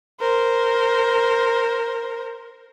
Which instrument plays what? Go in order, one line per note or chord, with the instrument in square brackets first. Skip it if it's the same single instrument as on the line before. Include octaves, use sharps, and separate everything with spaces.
[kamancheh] A#4 C5